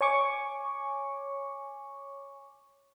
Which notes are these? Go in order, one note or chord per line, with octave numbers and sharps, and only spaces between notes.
C#5 G#5 C#6 D6